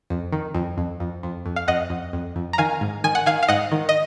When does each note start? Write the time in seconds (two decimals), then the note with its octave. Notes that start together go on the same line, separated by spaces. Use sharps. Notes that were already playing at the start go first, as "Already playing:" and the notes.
0.10 F2
0.33 D#3
0.55 F2
0.78 F2
1.00 F2
1.23 F2
1.46 F2
1.56 F5
1.68 F2 D#5 F#5
1.90 F2
2.13 F2
2.36 F2
2.53 A#5
2.58 D#3 F5 G#5
2.81 G#2
3.04 D#3 G#5
3.15 F#5
3.26 D#3 F5 G#5
3.43 F5
3.48 G#2 D#5 F#5
3.72 D#3
3.89 D#5